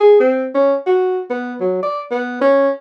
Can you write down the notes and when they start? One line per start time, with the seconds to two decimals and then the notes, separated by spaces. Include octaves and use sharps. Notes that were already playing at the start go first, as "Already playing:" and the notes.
0.01 G#4
0.20 C4
0.55 C#4
0.87 F#4
1.30 B3
1.61 F#3
1.83 D5
2.11 B3
2.41 C#4